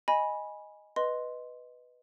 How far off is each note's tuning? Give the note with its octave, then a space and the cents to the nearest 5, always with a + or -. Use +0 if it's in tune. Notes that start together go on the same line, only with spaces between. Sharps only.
D#5 +0 G#5 +0 B5 -15
B4 +0 D#5 +0 C6 +0